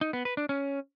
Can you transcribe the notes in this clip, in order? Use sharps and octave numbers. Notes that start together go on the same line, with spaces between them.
D#4
B3
B4
D4
C#4